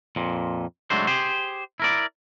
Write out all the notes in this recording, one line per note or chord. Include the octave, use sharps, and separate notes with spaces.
F2 A#2
F#3 G#3 A3 D4 C5
G4 G#4 C5
E4 A#4 D5